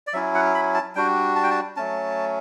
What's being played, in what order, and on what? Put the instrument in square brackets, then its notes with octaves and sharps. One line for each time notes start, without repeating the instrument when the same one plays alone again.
[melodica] D5
F#3 C#4 E4 E5
F#5
B5
A5
G3 D4 F#4 G5
A5
G5
A5
F#3 A3 C#4 A5